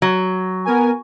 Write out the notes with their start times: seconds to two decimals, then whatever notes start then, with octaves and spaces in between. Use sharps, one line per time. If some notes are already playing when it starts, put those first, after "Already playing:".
0.02 F#3
0.65 B3 A#4 G#5